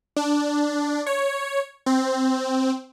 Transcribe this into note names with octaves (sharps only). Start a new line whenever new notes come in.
D4
C#5
C4